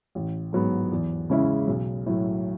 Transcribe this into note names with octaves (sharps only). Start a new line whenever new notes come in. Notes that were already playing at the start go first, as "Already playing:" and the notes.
A1
G#2 F#3 B3
E2
C#3 G#3 C#4 E4
B1
A2 F#3